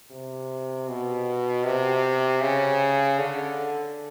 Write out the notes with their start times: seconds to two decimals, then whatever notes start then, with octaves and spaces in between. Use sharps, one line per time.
0.11 C3
0.88 B2
1.65 C3
2.41 C#3
3.18 D3